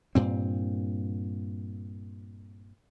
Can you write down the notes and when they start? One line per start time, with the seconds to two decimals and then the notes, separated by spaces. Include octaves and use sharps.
0.15 G2 A#2 C4